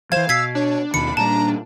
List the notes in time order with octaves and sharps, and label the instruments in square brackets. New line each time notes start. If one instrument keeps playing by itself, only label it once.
[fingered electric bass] E3 F3 [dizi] C5 [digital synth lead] F5 [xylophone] G#6 E7
[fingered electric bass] B2 [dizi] E6 [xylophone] G#6 B6 C7
[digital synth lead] D4 [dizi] C#5
[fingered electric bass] D#2 B2 D#3 [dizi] B5 [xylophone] C#7
[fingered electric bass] A#2 G3 [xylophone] A5 [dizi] A#5